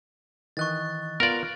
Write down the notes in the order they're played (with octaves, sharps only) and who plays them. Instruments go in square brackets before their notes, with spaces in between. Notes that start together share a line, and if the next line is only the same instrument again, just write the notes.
[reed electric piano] D#3 E3 D#5 [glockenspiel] C#6 F#6 A6
[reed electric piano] B3 F4 [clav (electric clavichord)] A#4 D5